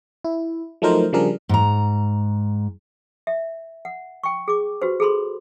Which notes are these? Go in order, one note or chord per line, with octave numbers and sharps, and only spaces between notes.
E4
F3 F#3 A3 D#4 A#4 C5
C#3 F3 G3 D4 G#4 A#4
G#2 A#5
E5
F#5
G5 C#6
G#4 D6
F#4 G4 B4 C5
G#4 A4 B5 C6